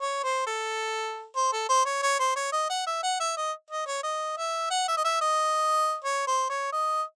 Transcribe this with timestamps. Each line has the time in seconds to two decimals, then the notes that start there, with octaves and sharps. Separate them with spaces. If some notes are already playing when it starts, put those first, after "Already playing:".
0.01 C#5
0.23 C5
0.47 A4
1.36 C5
1.52 A4
1.69 C5
1.86 C#5
2.03 C#5
2.19 C5
2.36 C#5
2.53 D#5
2.70 F#5
2.87 E5
3.03 F#5
3.20 E5
3.37 D#5
3.71 D#5
3.87 C#5
4.03 D#5
4.37 E5
4.71 F#5
4.88 E5
4.97 D#5
5.05 E5
5.21 D#5
6.04 C#5
6.27 C5
6.50 C#5
6.73 D#5